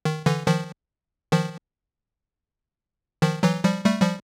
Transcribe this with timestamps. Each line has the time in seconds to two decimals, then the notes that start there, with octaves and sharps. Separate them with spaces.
0.05 D#3
0.26 D3 E3
0.47 D#3 F3
1.32 D#3 F3
3.22 D#3 F3
3.43 E3 F#3
3.64 F3 G3
3.85 G3 A3
4.01 F3 G3